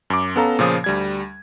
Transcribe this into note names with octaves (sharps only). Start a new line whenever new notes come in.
F#2 D6
B3 C#4 A4 F5 A#5
A#2 C#3 F3 D#6
D2 G3 G#6